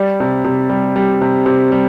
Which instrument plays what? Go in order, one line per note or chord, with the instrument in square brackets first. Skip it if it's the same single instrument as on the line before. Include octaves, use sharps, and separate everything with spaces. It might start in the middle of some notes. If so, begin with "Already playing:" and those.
Already playing: [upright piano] G3 D5
C3
C3
G3
G3
C3
C3
G3